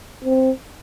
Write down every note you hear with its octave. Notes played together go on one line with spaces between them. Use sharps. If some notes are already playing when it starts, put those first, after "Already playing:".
C4